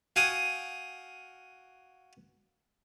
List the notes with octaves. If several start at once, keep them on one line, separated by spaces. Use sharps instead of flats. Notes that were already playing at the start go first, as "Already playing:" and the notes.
F#4 F5 G5 G#5 D#6